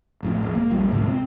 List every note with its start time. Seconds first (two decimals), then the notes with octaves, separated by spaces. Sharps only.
0.23 A1 F2 A2
0.43 E1
0.55 A#3
0.70 D#1 A#1 A#2 G3
0.92 D2 G#2 C3
1.07 C4